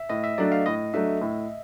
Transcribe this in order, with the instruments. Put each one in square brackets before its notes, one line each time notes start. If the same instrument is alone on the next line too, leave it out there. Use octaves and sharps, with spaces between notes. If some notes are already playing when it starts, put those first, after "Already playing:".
Already playing: [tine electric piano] E5
[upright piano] A2 [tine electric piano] D#5
[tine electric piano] E5
[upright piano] F#3 A3 D4 [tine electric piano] D5
[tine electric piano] F5
[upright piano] A2 [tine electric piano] D#5
[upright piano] F#3 A3 D4 [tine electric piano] E5
[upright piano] A2